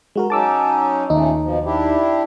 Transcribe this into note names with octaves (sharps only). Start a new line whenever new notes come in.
G#3 F#4 A#4
F#3 C#4 D#4 A5 D6 E6
D#2 A#2 C#3 A3 D#4
B2 F3
D4 E4 G4